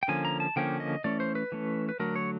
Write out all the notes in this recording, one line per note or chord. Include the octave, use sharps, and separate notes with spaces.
G5
D3 F3 A#3 C#4 G#5
A#5
A5
D3 F3 A#3 C#4 G5
D#5
E3 A3 C#4 D5
C5
B4
E3 A3 C#4
B4
D3 F#3 A3 A#4
C#5